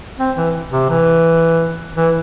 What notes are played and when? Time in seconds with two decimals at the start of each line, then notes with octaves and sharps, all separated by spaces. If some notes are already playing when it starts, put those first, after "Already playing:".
0.19 C4
0.36 E3
0.72 C3
0.89 E3
1.96 E3